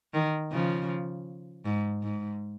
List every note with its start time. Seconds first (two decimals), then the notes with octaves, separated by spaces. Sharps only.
0.14 D#3
0.52 C#3 F3
1.66 G#2
2.03 G#2